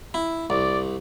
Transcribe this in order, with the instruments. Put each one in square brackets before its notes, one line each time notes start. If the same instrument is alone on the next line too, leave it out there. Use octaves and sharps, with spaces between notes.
[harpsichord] E4
[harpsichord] C2 [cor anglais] D5